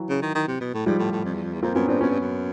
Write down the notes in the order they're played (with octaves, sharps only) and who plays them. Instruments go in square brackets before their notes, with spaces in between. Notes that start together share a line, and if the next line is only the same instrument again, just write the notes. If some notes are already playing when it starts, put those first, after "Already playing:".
Already playing: [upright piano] E3 F#3
[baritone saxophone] C#3
D#3
D#3
C3
B2
A2
[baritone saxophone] G#2 [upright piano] F3 G3
[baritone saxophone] A2
A2
F2
E2
F2
E2
[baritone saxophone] F2 [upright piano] A#3 C4
[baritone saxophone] F#2 [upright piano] B3 C#4
[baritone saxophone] G2 [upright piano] C4 D4
[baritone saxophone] F#2 [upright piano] B3 C#4
[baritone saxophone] G2
F#2